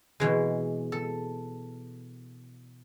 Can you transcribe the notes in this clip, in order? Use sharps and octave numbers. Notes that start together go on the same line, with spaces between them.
B2 E3 G#3
A4